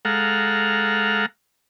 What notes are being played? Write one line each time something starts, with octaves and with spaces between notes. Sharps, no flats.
G#3 A4 F5 F#5 A#5